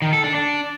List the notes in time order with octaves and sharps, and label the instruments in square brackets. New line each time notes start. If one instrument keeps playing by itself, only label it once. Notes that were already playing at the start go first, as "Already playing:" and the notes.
[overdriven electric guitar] D#3
A4
D4
D4